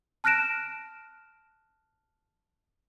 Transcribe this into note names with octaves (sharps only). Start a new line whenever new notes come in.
A5 F6 F#6 A#6 D7 E7